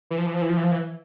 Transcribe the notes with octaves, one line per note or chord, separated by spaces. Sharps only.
E3
F3
E3
F3
E3
F3
E3
F3
E3